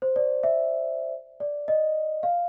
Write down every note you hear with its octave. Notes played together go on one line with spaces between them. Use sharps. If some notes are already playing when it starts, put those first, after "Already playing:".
C5
D5
E5
D5
D#5
F5